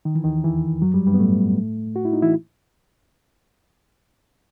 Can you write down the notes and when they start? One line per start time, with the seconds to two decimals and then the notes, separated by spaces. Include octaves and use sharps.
0.05 D#3
0.15 E3
0.24 D#2 D#3
0.44 E2 E3
0.82 F#2 F#3
0.94 G2 G3
1.06 G2 G3
1.14 B3
1.19 A2 A3
1.96 F#4
2.05 E4
2.13 D#4
2.22 E3 E4